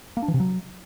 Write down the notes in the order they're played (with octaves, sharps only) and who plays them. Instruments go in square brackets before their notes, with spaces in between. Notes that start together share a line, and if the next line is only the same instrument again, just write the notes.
[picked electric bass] A#3
D4
E3
C3
F#3